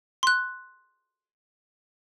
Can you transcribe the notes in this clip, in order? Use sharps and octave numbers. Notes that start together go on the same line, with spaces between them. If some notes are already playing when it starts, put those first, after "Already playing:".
C6 F#6